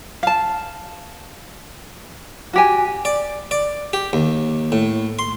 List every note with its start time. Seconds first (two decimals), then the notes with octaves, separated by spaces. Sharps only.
0.23 F5 A5
2.53 F#4 G4 G#5
3.05 D5
3.51 D5
3.93 G4
4.13 D#2
4.72 A2
5.19 C6